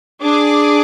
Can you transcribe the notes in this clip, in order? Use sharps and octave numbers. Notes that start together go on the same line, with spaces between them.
D4 G#4 D6